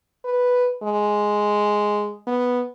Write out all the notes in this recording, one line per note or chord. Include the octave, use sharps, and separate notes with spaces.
B4
G#3
B3